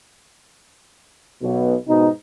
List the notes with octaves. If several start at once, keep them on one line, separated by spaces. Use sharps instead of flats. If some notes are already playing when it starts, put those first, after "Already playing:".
B1 B2
G#2 B2 D#4